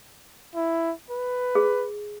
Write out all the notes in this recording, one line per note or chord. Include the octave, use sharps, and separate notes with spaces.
E4
B4
G#4